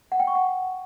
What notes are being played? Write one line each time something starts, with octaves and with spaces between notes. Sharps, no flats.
F#5
G5
C#6
F#5